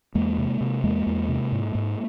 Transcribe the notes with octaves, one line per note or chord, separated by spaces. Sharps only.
E2 G#3 A#3
C3
C3
E2 G#3 A#3
E2
C3
G#2
G#2